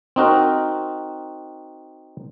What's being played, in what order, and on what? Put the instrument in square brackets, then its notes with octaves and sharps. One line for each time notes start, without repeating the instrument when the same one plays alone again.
[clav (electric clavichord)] C4 D#4 F#4 A#4